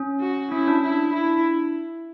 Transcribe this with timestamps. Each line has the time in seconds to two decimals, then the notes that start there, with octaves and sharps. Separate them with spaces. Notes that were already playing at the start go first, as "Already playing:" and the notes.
Already playing: C#4
0.21 F#4
0.51 C#4 E4
0.68 D4
0.83 E4
1.13 E4